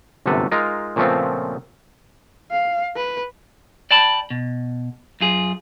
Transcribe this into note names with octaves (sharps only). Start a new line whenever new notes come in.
G1 F#2 C3 A3 A4 B4
G#3 D#4 F4 A#4
A#2 C#3 F3 A3 B3 C4
F5
B4
D5 G5 A5 B5
B2
F#2 F4 G#4